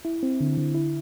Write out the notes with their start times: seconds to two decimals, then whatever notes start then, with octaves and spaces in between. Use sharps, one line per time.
0.05 E4
0.23 C4
0.40 D3
0.57 D3
0.75 E4